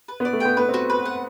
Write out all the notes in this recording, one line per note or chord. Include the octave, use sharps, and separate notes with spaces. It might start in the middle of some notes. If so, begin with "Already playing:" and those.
B4
B3 D5
A3
B3 G5
B3 B4
C4 F#4
B4
F#5